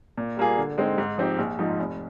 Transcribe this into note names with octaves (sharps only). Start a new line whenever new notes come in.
A#2
G3 A#3 F4 G#4
D3
G#3 C4 D#4
G#2
F3 C4 D#4 G4
A#1
G#2 F3 G#3 D#4
F1